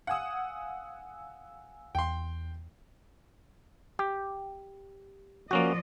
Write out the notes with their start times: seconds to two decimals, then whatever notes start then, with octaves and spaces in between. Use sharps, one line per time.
0.07 F5 F#5 G#5 D#6 E6
1.95 E2 G5 C6
3.99 G4
5.51 F3 A#3 C#4 F#4 D5 D#5